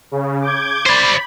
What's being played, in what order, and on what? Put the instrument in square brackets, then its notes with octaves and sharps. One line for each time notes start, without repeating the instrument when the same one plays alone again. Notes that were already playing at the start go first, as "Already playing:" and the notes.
[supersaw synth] C#3
D6 G6 G#6
[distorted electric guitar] C5 D5 [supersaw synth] B5